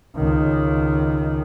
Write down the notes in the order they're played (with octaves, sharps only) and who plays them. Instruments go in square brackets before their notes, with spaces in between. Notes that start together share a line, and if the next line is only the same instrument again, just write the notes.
[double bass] C#2 D#3